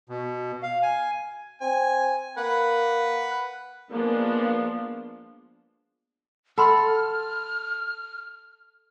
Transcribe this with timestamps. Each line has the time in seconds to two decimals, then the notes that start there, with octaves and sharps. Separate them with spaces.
0.09 B2
0.63 F5
0.83 G#5
1.61 C4 G#5
2.38 A#3 B4 F#5
3.92 F3 G#3 A#3 B3 D4
6.58 A4 F#5 B5 C6 F6